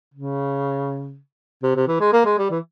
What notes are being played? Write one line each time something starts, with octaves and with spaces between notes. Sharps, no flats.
C#3
C3
C3
E3
G#3
A#3
G#3
G3
E3